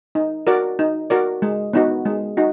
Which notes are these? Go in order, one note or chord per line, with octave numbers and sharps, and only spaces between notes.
D#4
F#4 A#4 D5
D#4
F#4 A#4 D5
G#3
B3 D#4 F#4
G#3
D#4 F#4